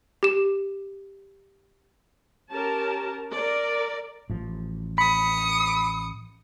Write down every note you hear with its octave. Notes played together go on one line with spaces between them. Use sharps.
G4 E7
C#4 G4 A#4 A5
A#4 D5
A1 F3
B5 D#6 C#7